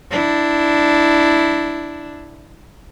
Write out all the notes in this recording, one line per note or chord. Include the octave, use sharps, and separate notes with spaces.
D4 E4